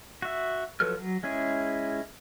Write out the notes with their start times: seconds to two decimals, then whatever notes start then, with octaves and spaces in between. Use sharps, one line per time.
0.22 F#4 E5
0.80 F3 F#3 A4 B4 F6
0.99 F#3
1.23 G#3 C#4 E4 G#4